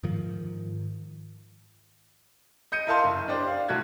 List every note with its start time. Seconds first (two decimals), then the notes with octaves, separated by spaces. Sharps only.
0.03 G#2 D#3 F3
2.72 D#5 G6 C#7 D#7
2.87 E4 A#4 D#5 F5 A5 C6
3.04 F#1
3.28 D4 G4 C5 D5
3.47 F5
3.68 B1 A3 F#4 F#6 G#6